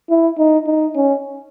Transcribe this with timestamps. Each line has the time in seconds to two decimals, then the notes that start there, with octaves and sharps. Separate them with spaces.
0.10 E4
0.38 D#4
0.67 D#4
0.96 C#4